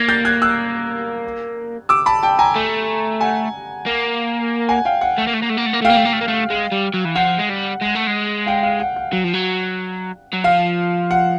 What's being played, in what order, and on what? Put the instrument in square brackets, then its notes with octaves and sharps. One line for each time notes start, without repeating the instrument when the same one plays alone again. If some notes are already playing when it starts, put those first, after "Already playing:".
Already playing: [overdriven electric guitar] A#3 [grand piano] G#6 A#6
[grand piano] G6 A6
F#6 G#6
E6 F#6
D6 E6
A5 B5
G5 A5
G#5 A#5
[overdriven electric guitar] A3
[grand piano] F#5 G#5
[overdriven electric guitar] A#3
[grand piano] F#5 G#5
F5 G5
F#5
[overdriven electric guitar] A3
A#3
A3
A#3
A3
A#3
A3
A#3
A3
[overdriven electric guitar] A#3 [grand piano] F5 G5
[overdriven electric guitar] A3
A#3
A3
A#3
A3
G#3
G3
F#3
E3
[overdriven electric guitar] F3 [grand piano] F#5
[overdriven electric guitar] G#3
G3
G#3
A3
G#3
[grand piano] F5 G5
F5
F#5
F#5
[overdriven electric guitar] F#3
F3
F#3
F#3
[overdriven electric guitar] F3 [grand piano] F5
[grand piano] F#5